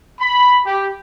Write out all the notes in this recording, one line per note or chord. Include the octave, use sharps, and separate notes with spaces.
B5
G4